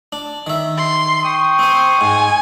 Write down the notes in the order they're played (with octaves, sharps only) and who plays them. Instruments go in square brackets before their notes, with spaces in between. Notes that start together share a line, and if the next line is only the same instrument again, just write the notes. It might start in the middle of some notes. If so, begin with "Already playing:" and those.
[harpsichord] D4
D#3 E5
[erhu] C6
[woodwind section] G5 C#6 D#6
[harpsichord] C4 G#5 [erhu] C5
[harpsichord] G#2 [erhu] G#5